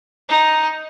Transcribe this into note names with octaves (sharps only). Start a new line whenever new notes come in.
D#4